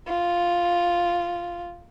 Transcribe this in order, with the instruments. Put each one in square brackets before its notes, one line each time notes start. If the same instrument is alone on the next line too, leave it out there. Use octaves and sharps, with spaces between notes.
[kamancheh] F4